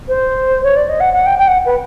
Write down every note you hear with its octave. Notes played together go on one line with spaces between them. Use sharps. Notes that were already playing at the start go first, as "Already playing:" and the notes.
C5
C#5
D5
D#5
F#5
F#5
G5
G5
F#5
B4